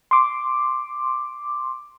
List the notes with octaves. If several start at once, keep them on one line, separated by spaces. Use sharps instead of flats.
C6 D6